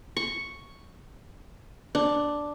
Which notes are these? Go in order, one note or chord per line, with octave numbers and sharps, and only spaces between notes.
C#6
D4